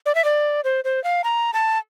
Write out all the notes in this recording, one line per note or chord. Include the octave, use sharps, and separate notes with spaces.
D5
E5
D5
C5
C5
F5
A#5
A5